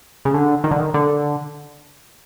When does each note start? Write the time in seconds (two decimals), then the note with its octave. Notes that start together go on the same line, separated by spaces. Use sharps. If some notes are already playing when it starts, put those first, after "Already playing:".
0.25 C#3
0.34 D3
0.64 D#3
0.71 D3
0.80 D#3
0.94 D3